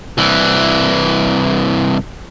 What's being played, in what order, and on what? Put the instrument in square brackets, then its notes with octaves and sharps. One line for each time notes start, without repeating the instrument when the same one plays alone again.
[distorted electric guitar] C2 E3